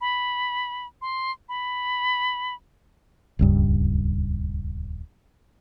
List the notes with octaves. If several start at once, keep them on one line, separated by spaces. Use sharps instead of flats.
B5
C6
B5
D#1 C#2 G2